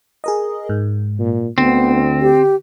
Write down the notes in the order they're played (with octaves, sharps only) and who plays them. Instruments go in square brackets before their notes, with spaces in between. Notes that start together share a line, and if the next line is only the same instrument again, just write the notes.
[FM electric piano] G#4 A#4 D#5
G#2
[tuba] A#2
[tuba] D2 [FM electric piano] D3 [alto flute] B3 [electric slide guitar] C4
[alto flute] G4